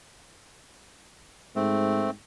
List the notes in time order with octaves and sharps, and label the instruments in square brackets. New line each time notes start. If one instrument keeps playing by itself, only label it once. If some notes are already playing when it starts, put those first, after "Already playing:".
[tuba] G#2 [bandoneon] A3 C4